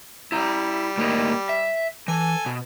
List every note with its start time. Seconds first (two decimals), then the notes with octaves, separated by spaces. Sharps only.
0.32 G3 E4 A#5
0.98 A2 A#3 D#4
1.49 E5
2.08 E3 A4 G#5
2.46 B2